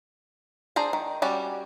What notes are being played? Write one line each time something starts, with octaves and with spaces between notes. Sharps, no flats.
D4 G#4 C5 A#5
D#3
G3 C#4 F#4 D5